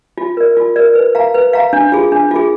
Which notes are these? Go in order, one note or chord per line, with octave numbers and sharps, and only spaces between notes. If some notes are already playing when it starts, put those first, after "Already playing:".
F4
A#4 D5
F4
A#4 D5
B4
F5 A#5
B4
F5 A#5
D4
F4 G#4
D4
F4 G#4